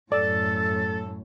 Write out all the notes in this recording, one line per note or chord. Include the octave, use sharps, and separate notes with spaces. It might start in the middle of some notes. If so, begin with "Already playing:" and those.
F#2 A2 A4 D5 A6